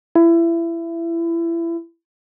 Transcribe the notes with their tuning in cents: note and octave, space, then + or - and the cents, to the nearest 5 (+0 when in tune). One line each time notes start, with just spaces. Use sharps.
E4 +25